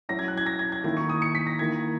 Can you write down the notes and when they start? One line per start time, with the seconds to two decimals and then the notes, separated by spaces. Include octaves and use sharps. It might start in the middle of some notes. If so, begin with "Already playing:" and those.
0.09 F#3 C#4 E4 A#6
0.19 G#6
0.28 F#6
0.37 G#6
0.46 A#6
0.59 G#6
0.72 G#6
0.84 D#3 A#3 E4 G#6
0.97 C#6
1.10 D#6
1.22 C#7
1.35 B6
1.47 A#6
1.59 D#3 A#3 E4 G#6